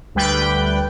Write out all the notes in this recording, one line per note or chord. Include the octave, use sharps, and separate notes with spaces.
D2 G3 B4 G5